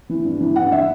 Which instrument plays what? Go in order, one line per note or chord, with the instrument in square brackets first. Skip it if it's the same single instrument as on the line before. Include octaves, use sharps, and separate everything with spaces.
[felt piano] E3
G2
E3
G2 F#5
E3 E5